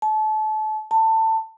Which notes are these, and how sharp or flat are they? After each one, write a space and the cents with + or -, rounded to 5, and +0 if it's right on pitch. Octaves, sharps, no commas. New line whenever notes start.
A5 -30
A5 +20